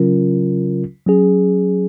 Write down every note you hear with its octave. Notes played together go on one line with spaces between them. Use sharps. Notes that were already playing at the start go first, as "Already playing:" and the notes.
Already playing: C#3 F#3 C#4 F4 A#4
F#3 C#4 G#4